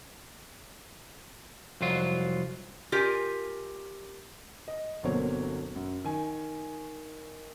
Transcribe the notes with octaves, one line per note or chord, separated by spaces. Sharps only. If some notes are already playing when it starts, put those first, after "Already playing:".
C2 F2 F#3 F4
F4 G4 A#4 D5 G#5
D#5
G1 B2 F#3 A#3 C4 C#5
F#2
D#3 G#5